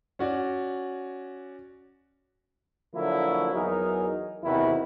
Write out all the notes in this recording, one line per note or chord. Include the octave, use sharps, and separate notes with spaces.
C#4 F#4 D5
D3 F3 F#3 A#3 E4
E2 F#3 D#4 G#4 A#4
E2 C3 D#3 E4 F#4